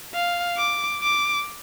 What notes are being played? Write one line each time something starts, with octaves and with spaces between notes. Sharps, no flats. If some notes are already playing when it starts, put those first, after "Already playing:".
F5
D6
D6